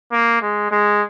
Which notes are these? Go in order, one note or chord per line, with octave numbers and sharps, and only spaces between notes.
A#3
G#3
G#3